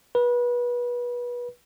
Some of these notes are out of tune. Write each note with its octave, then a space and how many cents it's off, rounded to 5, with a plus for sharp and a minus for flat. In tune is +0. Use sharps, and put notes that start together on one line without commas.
B4 -25